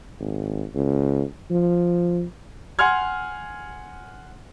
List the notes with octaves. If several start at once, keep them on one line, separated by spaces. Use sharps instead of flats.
G#1
C#2
F3
F#5 G#5 C6 F6 G#6